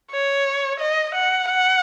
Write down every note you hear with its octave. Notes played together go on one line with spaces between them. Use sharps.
C#5
D#5
F#5
F#5